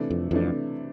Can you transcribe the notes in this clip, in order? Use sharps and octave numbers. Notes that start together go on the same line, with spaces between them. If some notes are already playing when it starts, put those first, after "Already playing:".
Already playing: C3 E3 A3 D4
F2
F2 C3 E3 A3 D4